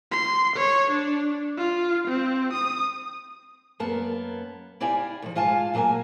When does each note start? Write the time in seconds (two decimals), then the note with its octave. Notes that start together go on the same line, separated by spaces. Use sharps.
0.12 C6
0.57 C#5
0.91 D4
1.58 F4
2.08 C4
2.53 D#6
3.80 F#2 A#3 B3 A5
4.80 E4 G4 D5 F5 G#5
5.22 D2 F3
5.35 G#2 F4 F5 G#5 A5
5.74 A#2 F#3 A#3 D#5 G#5